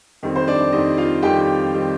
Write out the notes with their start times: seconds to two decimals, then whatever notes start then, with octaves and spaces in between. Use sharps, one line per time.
0.23 F2 D#3 G3 C4
0.36 C5
0.48 D4 D5
0.72 F2 D#3 G3 C4 D#4 D#5
0.97 F4 F5
1.22 F2 D#3 G3 C4 G4 G5
1.74 D#3 G3 C4